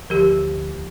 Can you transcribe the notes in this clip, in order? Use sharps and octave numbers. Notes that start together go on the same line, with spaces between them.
D2 F3 G4 A#4